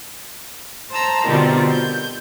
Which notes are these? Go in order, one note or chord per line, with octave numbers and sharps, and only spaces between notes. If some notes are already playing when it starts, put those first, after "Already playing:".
C5 A5 A#5 E6
B2 D3 D#3 G3 C4 F4
G6